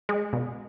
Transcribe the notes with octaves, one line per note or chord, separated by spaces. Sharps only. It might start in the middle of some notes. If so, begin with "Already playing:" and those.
G#3
B2